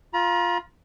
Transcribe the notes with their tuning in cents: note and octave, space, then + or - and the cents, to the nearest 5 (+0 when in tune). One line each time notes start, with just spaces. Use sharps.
F4 +0 A#5 +45